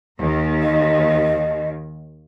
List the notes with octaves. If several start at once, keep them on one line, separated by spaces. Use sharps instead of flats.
D#2 D#3
D#5